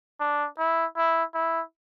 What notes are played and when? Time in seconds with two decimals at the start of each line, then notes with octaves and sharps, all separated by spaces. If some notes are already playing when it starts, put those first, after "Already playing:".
0.20 D4
0.59 E4
0.97 E4
1.34 E4